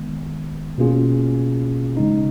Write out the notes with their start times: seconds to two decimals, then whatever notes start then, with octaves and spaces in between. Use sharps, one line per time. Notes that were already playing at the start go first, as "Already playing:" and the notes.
Already playing: D#3 G#3 B3
0.78 B2 A#3 C#4 F4 G#4
1.97 C#3 G#3 D#4